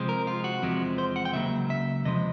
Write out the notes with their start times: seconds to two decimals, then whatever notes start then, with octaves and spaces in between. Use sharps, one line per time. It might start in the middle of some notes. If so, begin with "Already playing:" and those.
Already playing: C3 F3 G#3 C4
0.09 A#4
0.27 F4
0.44 F#4
0.62 E2 C3 F3 G#3 C4
0.98 C5
1.16 F#5
1.25 G5
1.33 C#2 C#3 F#3 A#3 E5
1.70 E5
2.05 E2 C3 F3 G#3 D#5